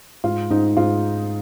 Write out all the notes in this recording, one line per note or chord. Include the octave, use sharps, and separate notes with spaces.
G#2 F4
G#2 D#4
G#2 F4